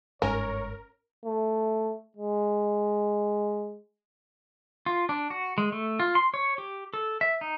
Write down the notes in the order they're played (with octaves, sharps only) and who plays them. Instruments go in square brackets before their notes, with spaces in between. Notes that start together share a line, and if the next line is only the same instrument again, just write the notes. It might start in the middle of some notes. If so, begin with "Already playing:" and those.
[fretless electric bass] G1 G#2 G#3 [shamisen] C#4 [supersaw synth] A#4 [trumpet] C#5
[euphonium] A3
G#3
[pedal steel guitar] F4
D4
F#4
G#3
A3
F4
C6
C#5
G4
A4
E5
D#4